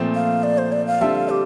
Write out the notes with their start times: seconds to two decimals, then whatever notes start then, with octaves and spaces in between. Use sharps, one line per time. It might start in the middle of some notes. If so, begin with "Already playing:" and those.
Already playing: A#2 F3 A3 C4
0.15 F5
0.43 D5
0.58 C5
0.72 D5
0.87 F5
1.01 D3 G3 C4 F4 A4 E5
1.15 F5
1.29 G4